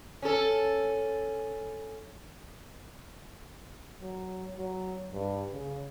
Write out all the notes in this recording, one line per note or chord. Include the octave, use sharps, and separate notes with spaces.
C#4 A4
F#3
F#3
G2
C#3